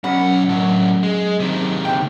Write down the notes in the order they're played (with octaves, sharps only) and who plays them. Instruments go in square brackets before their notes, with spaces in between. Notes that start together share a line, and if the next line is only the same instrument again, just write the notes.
[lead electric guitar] B1 F#5 [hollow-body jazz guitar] F#2 C#4 B5
[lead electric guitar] A2 F#3
G#3
C3 D#3
[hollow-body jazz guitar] D2 G5